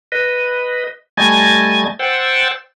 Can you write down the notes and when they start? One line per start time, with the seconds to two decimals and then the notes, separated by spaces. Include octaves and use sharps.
0.12 B4 D#5
1.17 G3 A3 D#5 G#5 G#6 A6
1.99 C5 F#5 G5 E6 A6